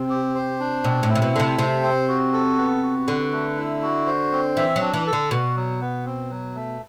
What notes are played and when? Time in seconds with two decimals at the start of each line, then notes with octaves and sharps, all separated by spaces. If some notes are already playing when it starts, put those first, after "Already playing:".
Already playing: C3 C4
0.10 G4
0.35 C5
0.60 D4
0.84 B2 C4
1.03 A2
1.09 E4
1.15 C3
1.22 B2
1.34 D3 A3
1.39 C3
1.58 C3 C5
1.83 C4
2.08 F#4
2.33 A4
2.58 B3
2.83 F#4
3.07 D3 B4
3.32 A3
3.57 E4
3.83 F#4
4.06 C5
4.32 C4
4.57 E3 E5
4.76 F#3
4.81 D4
4.93 E3
5.07 A4
5.13 D3
5.31 B2 F#4
5.56 F#3
5.81 B3
6.05 C4
6.30 F#3
6.55 A3